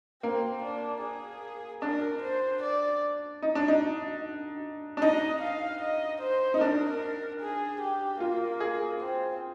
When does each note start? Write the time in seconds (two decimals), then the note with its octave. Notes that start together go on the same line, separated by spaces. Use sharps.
0.23 A#3 C4
0.63 D4
1.03 G#4
1.82 D4 A#4
2.23 C5
2.63 D5
3.42 D#4
3.55 D4
3.68 D#4
4.97 D4
5.02 D#4 D#5
5.41 F5
5.81 D#5
6.21 C5
6.54 D#4
6.61 D4 A#4
7.41 G#4
7.81 G4
8.20 A#3 F4
8.60 G#4
9.00 C4